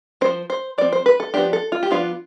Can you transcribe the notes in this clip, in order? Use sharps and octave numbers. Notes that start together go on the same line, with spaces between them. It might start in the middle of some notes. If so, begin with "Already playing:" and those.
F3 C4 C5
C5
F3 C4 D5
C5
B4
A4
F3 B3 D4 G4
A4
F4
G4
F3 B3 D4 F4